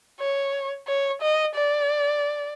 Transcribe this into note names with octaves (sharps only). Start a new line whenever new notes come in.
C#5
C#5
D#5
D5